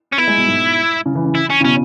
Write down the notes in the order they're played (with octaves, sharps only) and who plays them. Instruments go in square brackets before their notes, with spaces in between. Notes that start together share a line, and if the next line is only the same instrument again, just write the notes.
[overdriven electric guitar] C#4
[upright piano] B3 [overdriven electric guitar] E4
[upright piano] G#3
B2
G#2
C#3
E3
C#3
[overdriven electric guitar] E4
C#4
[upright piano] C#3
[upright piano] B2 [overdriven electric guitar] C#4